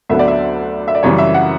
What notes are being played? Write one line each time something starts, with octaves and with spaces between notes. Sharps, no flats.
D2 D3 F#3 B3 E5
D5
E5
E5
D5
F#2 C#3 E3 G3 C#5
E5
F#5